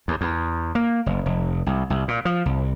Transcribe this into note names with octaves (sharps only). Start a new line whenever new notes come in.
D#2
E2
A#3
F#1
F1
C2
C2
A#2
F3
C2